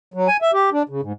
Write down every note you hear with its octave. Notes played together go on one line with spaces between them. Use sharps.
F#3
G#5
E5
G4
D4
C#3
G#2